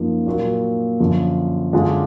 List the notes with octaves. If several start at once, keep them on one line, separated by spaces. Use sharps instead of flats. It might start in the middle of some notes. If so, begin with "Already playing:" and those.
Already playing: F#2 F3 A#3 D#4
A#2 F#3 A#3
F#2 D3 F3
F#2 D3 G#3 D4 F4